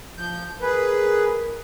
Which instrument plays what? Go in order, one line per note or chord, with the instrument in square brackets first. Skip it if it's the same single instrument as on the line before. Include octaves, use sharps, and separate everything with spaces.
[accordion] F3 G6
[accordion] G#4 B4 [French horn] A#4